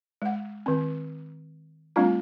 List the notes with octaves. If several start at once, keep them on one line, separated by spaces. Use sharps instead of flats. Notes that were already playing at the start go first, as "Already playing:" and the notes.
G#3 F#5
D#3 C4
G3 A3 C4 D4 F4